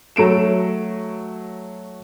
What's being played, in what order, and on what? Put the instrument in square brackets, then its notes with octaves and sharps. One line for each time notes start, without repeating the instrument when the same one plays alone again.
[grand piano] F#3 A3 D7 E7